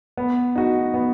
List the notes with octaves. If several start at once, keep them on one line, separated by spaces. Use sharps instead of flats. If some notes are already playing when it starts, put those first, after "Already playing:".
B3
D#4 F#4
B3